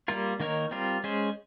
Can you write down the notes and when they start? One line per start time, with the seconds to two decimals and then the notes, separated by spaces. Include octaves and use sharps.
0.08 G3 A#3 F4 A#4
0.40 D#3 A#3 D#4 A#4 C#5
0.71 G3 C4 F4 A#4
1.04 G#3 C#4 G#4 C5